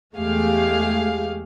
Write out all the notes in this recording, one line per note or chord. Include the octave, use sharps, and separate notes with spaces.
E2 G#3 A3 G4 G#4 F5